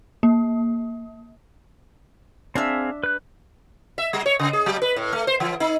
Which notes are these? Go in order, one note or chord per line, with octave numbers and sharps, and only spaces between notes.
A#3
C4 D4 G#4 E5 F5
B4 F#6
E5
G3
C#5
C#3
G#4
F#3
B4
A2
A3
C5
E3
D#4